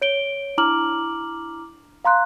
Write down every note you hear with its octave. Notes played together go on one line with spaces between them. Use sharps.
C#5 D7 G7
D4 E4 A#5 D6 F6 F#7
F5 A#5 C6 F#6